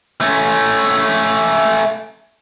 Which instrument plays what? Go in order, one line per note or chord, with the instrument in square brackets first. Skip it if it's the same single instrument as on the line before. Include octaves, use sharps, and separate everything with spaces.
[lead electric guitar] A3 C#4